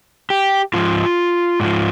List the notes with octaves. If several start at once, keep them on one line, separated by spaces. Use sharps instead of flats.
G4
G#2 F3 F4
G#2 F3